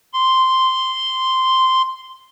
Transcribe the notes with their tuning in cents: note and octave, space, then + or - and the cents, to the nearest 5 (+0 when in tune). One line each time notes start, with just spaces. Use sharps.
C6 -5